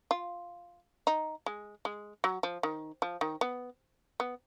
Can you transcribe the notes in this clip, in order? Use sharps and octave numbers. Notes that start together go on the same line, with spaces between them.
F4
D#4
G#3
G#3
F#3
F3
D#3
F3
D#3
B3
B3